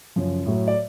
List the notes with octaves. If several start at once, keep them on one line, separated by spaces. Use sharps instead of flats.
F#2 C#3 F3
A2 F#3 A3
D5